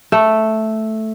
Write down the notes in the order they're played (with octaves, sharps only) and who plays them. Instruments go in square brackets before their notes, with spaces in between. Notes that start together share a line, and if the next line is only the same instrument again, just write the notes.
[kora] A3